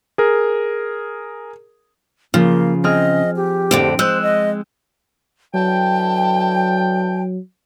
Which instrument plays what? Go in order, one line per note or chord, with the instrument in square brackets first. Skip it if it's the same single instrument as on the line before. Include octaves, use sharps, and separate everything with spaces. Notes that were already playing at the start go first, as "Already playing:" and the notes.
[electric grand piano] G#4 A#4
[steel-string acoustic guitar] C#3 [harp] F3 F4 [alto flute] A#3
[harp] C4 G#4 F6 [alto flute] D#5
[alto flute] G4
[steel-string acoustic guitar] F2 A2 D3 [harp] C4 D7
[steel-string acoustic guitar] G#3 [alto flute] C5 [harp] E6 F#6 G6
[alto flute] D#5
[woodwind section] D3 E3 G5 [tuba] F#3 [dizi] A5